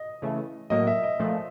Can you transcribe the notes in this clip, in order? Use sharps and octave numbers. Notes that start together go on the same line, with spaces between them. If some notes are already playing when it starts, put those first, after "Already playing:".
Already playing: D#5
C#3 E3 A3
A2 F#3 A#3 D#5
E5
D#5
A#2 F3 A3